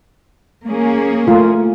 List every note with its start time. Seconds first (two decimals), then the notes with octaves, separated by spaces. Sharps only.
0.67 A#3 C#4 G#4
1.27 A3 F4 A#4